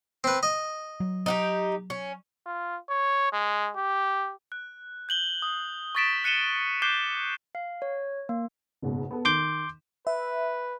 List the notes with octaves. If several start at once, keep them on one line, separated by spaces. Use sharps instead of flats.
C4 B4
D#5
F#3
D#4 F#4 G4
C#4
F4
C#5
G#3
G4
F#6
G6 F#7 G7
D#6
C#6 D#6 A6 B6 D7 E7
F#6 C#7 D#7 E7 G7
D6 F#6 G6 C7 E7 G7
F5
C#5
A#3
F#1 G#2 B2
B3 A4
D#3 C6 D6 G6
B4 E5